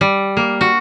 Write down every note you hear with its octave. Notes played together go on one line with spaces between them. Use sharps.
G3
A#3
F#4